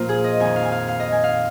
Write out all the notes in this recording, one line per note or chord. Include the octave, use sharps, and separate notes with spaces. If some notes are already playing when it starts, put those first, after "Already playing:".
Already playing: A#2 F3 F4 A#4 C5
G#4
D#5
F2 D#3 G#5
F5
G#5
F5
F5
D#5
G#5
F5